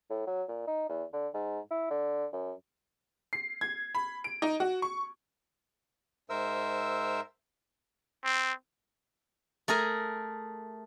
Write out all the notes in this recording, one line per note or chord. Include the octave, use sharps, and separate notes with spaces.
A2
F#3
A#2
D#4
E2
D3
G#2
E4
D3
F#2
C7
G#6
B5
D7
D#4
F#4
C#6
G#2 A#4 C5 E5 E6
C4
A3 G#4 A#4 G#5